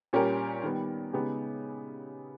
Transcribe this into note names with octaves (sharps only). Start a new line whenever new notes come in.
A#2 G3 C#4 G4 A#4
D#3 G3 B3
C#3 G#3 B3 D#4 G4